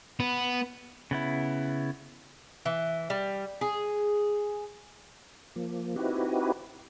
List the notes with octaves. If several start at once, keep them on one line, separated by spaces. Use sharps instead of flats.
B3
C#3 B3 E4
E3
G3
G#4
F3 A#3
C4 D#4 E4 F#4 G4 B4